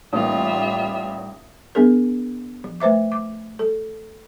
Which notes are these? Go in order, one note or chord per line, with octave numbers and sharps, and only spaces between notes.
A1 G3 A#3 D#4 F4 E5
B3 D4 G#4 A#4
F3
A3 B4 C5 E5 D6
D6
A4